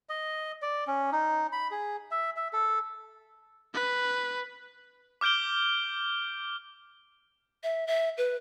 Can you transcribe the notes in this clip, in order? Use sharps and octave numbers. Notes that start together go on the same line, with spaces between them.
D#5
D5
C#4
D#4
B5
G#4
E5
E5
A4
B4
D6 F6 G6 D7 G7
E5
E5
B4